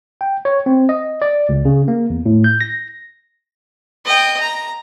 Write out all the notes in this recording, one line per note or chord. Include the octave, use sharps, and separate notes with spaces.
G5
C#5
C4
D#5
D5
C#2
C#3
A#3
E2
A2
G6
A#6
D#5 G5
A#5